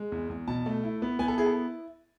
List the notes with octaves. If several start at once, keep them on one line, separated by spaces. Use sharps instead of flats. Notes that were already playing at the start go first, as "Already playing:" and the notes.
Already playing: G#3
E2
E2
B2 A5
A3
E4
B3
B3 G#5
A4
E4 G#4
A4